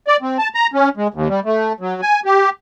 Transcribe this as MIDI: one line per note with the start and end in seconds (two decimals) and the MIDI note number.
0.08 0.16 74
0.22 0.38 60
0.39 0.48 81
0.55 0.67 82
0.74 0.89 61
0.97 1.07 56
1.14 1.28 39
1.29 1.40 55
1.45 1.73 57
1.80 2.01 54
2.02 2.20 80
2.25 2.50 67